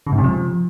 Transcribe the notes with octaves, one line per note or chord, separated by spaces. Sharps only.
C#3
G#2
C3
F3